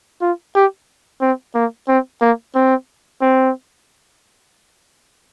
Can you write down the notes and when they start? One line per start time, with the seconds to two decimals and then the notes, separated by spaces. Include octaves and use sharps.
0.22 F4
0.55 G4
1.22 C4
1.55 A#3
1.88 C4
2.21 A#3
2.55 C4
3.21 C4